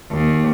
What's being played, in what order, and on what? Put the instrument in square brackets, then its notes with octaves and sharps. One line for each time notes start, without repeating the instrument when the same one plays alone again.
[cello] D#2